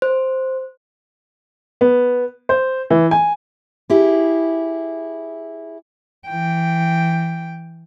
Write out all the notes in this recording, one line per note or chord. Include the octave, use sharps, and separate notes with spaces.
C5
B3
C5
E3
G#5
E4 G4 G#4
E3 G5